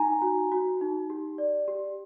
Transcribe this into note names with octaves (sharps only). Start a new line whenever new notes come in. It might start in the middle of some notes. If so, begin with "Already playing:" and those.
Already playing: D#4 G#5 A#5
F#4
F#4
D#4
G4
D5
G4